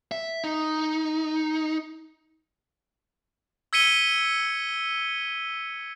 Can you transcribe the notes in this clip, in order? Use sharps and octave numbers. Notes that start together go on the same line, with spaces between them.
E5
D#4
E6 G#6 B6 C#7 D#7 G7